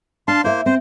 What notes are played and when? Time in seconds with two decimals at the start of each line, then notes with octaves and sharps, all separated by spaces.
0.28 D4 F5 A5 C6
0.44 A#3 E4 C5 E5
0.66 C4 C5